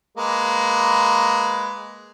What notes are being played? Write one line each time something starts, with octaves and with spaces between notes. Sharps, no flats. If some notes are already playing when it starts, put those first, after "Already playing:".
G#3 A#3 B4